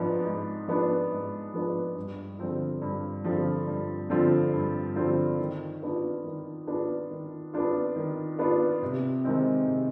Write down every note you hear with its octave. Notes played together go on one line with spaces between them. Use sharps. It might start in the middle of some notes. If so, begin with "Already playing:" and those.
Already playing: G#2 F3 B3 D4
G#2
F3 B3 D4
G#2
F3 B3 D4
G2
D3 F3 C4 F4
G2
D3 F3 C4 F4
G2
D3 F3 C4 F4
G2
D3 F3 C4 F4
D#3
B3 D4 F4
D#3
B3 D4 F4
D#3
B3 D4 F4
D#3
B3 D4 F4
C3
D#3 G#3 C4 D#4
C3